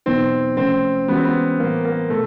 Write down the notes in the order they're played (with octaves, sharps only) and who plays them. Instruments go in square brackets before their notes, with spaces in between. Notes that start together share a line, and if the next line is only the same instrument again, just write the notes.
[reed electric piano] E2 B2 F#3 B3 D#4 [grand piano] C4
[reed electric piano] C#2 C3 F3 A3 C#4 [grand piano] C4
[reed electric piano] E3 G#3 C#4 F#4 [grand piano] B3
[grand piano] C4
B3
[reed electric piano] A2 E3 G3 [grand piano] A#3
[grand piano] A#3
[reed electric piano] B2 [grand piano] A3